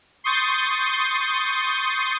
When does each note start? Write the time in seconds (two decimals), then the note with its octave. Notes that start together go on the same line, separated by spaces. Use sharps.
0.24 C6 C#6 D#6 G6 A6 C7